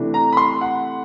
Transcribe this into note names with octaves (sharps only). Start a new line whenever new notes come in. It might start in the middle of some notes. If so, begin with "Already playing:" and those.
Already playing: C3 E3 A3 D4
A#5
B5
C6
F#5